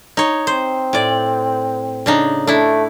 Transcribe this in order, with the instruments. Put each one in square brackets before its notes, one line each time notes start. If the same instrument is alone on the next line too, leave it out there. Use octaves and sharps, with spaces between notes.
[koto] D#4 C#5
[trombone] C4 [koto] C5
[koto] A2 D5
C#3 D4 D#4
[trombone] A3 [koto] D4 E4